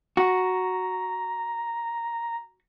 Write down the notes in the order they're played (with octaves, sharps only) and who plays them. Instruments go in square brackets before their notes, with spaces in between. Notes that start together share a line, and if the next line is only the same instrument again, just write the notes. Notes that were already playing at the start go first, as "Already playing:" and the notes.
[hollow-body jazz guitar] F#4 [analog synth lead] A#5